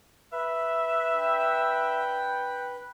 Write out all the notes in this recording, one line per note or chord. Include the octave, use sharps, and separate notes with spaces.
B4 E5
D4 F#5 G5